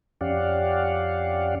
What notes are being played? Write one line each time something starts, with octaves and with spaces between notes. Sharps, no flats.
F2 C#4 G4 D5 F5 F#5